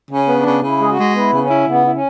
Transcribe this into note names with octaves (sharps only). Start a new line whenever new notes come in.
C#3 C#4
B3
D4
C#3
C#3 E4
G#3 G#4
F#4
G#3
B3 E4
C#3
C#4
E4
C#3 B3
E4
C#4